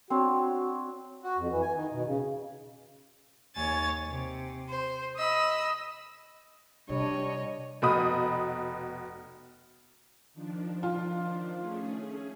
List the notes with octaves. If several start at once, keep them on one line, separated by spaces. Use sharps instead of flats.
C4 D4 F#4 C#5
F#4
F2
E3
G#5
D#3
B2
C#3
D#2 C#5 G#5 A6
C3
C5
D#5 B5 E6
C3 G3 D4 C#5 D#5
F1 B2 B5 D#6
D#3 F3 D4
F4
A3 C#4 G#4